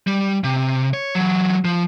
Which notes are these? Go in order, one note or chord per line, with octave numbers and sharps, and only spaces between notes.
G3
C3
C#5
E3 F#3
F3